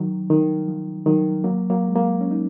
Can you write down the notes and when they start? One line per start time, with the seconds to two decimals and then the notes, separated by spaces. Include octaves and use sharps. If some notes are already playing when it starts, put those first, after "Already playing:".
Already playing: D#3 F#3
0.30 D#3
0.68 F3
1.06 D#3 F#3
1.44 F#3 A#3
1.70 F#3 A#3
1.88 G#3
1.95 F#3 A#3
2.21 C#4
2.31 D#4